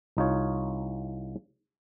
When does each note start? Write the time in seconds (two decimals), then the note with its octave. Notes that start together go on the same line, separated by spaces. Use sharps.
0.17 C2 D#4 F4 C#5